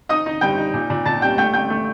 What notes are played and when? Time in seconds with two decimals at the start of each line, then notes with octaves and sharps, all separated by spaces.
0.09 D#4 D#5 D#6
0.26 D#4
0.41 G2 G5 G6
0.58 D#4
0.74 A#2
0.90 A#2
1.06 A#2 A5 A6
1.22 G3 G5 G6
1.38 A3 G5 G6
1.54 A3 G5 G6
1.70 A3